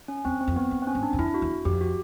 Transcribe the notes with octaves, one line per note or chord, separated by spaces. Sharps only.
C#4
E2 C4
C4
F2
B3
F#2
C4
C#4
G#2
D4
E2
F2 E4
F#4
E2
F2 G4
F#4